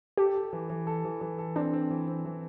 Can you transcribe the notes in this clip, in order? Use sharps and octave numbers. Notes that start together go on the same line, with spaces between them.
G4 A4
A4
E3
E3
A4
E3
E3
A4
C4 D4
C4
E3
C4
E3